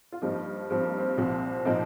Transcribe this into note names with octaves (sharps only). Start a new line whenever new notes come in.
F4
G2 F3 A#3 D#4
G2 F3 C4
A#3
C4
C2 A#2 F3
A#2 F3 A#3 D#4